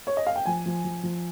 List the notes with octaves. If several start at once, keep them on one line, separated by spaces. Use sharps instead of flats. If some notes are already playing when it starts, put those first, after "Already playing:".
C#5
D#5
F5
G5
F3 G#5
F3
F3
F3